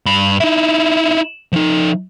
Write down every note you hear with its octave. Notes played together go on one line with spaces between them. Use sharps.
G2 B5
D#4 E4
F3 D#4